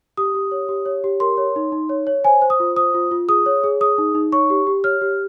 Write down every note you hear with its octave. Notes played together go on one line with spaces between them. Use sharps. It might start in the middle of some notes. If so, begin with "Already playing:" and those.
G4 D#6
G4
C#5
G4
C#5
G4
A#4 C6
C#5
D#4
D#4
C#5
C#5
C5 G#5
C5
D#6
F4
C5 D#6
F4
F4
G#4 D#6
C#5
G#4
G#4 D#6
D#4
D#4
C#5 C#6
G4
G4
C#5 F6
G4